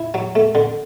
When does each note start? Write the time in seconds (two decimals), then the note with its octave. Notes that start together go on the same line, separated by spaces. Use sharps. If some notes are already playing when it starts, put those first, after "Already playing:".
Already playing: E4
0.14 F#3
0.35 A3
0.55 D3